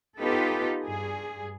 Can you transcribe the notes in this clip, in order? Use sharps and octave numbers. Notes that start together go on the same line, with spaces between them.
B3 D#4 F4 G4 A4 B4
G2 G#4